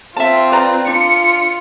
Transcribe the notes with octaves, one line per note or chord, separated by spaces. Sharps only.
C4 F4 E5 A5
B4 D5 A#5
D4 F4 C#7